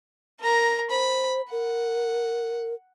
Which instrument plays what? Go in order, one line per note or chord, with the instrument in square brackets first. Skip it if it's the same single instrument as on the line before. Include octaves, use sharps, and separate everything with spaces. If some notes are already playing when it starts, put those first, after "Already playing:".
[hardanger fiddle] A#4 A#5
[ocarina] C5 [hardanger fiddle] B5
[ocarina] A#4 [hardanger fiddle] F#5